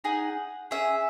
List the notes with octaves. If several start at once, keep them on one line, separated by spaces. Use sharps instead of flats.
D#4 G#4 F#5
C#4 G#4 E5